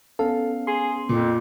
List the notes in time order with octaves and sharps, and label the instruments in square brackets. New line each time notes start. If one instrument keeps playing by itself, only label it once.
[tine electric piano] B3 C#4 [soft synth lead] A4 [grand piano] F5
[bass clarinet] G#4 [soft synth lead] C6
[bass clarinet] F2 [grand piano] A#2